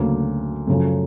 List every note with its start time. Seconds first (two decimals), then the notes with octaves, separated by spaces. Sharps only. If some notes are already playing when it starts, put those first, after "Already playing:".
Already playing: D2 C#3 F#3 A#3
0.67 F#2 C#3 F3 A3 C#4